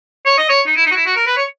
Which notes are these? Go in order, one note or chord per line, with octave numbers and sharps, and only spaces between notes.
C#5
D#5
C#5
D#4
E4
D#4
F#4
E4
F#4
A#4
B4
C#5